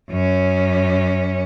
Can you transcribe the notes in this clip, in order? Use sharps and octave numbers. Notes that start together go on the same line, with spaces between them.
F#2 C#4